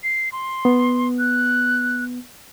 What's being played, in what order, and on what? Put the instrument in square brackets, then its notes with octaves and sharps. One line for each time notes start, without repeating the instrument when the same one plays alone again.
[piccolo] C7
C6
[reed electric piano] B3
[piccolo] F#6